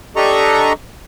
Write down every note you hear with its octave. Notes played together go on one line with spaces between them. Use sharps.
D4 G4 A4 D#5 A#5 C#6